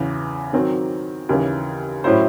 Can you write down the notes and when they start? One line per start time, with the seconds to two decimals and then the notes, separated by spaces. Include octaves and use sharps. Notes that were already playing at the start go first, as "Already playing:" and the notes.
Already playing: E2 C#3 E3
0.53 D#3 F#3 C4
1.29 D#2 C#3 E3
2.04 A2 F#3 C#4 E4 C5